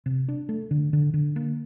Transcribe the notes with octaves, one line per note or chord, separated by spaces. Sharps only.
C3
D4
A3
D3
D3
D3
A#3